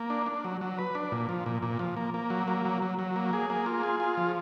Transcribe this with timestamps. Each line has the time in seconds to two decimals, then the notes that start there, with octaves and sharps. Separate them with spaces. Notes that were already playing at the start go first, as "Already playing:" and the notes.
Already playing: A#3
0.10 D4
0.26 D4
0.45 F#3
0.61 F#3
0.78 B4
0.95 D4
1.12 A#2
1.29 F3
1.46 A#2
1.62 A#2
1.79 F3
1.96 A#3
2.14 A#3
2.30 F#3
2.48 A#3
2.65 F#3
2.82 F#3
2.99 F#3
3.16 A#3
3.33 G#4
3.50 A#3
3.66 F4
3.83 G#4
4.00 F4
4.17 F3